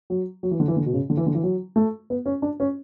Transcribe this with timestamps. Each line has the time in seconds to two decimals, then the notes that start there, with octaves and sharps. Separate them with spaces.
0.10 F#3
0.43 F#3
0.51 E3
0.60 D3
0.68 E3
0.77 D3
0.86 B2
0.93 C#3
1.10 D3
1.17 E3
1.26 D3
1.35 E3
1.43 F#3
1.76 A3
2.10 B3
2.26 C#4
2.42 D4
2.60 C#4